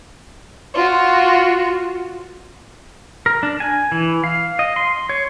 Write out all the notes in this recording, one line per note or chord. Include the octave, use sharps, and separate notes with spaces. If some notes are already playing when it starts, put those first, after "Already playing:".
F4 F#4
A#4
D4
G#5
E3
F5
D#5
C6
C#5